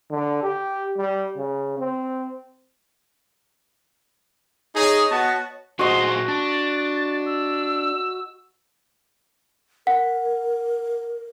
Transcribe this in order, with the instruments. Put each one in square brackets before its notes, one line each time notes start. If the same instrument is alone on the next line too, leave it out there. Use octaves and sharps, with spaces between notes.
[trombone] D3
G4
G3
C#3
C4
[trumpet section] D#4 G#4 [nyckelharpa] C#5 D#5
[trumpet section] B3 F#4 A5
[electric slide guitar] A#2 G#4 C5 [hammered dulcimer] F#4 D#5 [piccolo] C6
[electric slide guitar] D4 [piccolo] A6
[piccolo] E6
[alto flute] A#4 [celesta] F#5